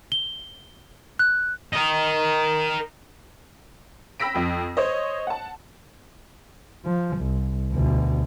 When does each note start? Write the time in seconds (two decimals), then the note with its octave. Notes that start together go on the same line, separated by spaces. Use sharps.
0.12 G7
1.19 F#6
1.74 A#4 D#5
4.20 G5 B5 E6 A#6 B6 D7
4.35 F2 G5
4.77 C5 C#5 D#5
5.27 F#5 A5
6.85 F3
7.17 C2
7.73 D2 B2